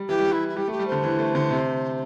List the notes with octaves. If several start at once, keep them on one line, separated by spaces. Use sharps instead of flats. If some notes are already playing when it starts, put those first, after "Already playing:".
Already playing: G3
E3 G4
G3
E3
E4
E4
G3 G4
A3
G4
G3
D3 C5
E3
A3
D3
C3